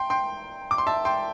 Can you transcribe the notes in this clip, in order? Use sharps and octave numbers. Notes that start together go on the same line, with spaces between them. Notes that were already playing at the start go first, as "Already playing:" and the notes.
Already playing: G5 C6
G5 C6
D6
C6
E5 A5
G5 C6